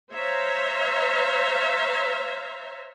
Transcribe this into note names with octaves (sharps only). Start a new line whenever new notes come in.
C5 C#5 E5 F5 A#5